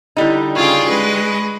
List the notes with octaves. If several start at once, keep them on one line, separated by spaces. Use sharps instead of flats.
D3 G3 D#4 E4 D#5
C#3 F4 G#4 G5 C#6 G#6
G#3 B4 D#5